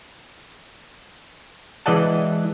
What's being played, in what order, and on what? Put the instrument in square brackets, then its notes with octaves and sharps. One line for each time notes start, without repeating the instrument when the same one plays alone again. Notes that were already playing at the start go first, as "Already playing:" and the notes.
[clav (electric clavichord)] E3 G#3 D5 D#5 F#5 A5